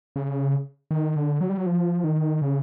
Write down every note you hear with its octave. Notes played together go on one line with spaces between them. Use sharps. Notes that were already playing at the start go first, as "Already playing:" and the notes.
C#3
D#3
D3
F#3
G3
F#3
F3
D#3
C#3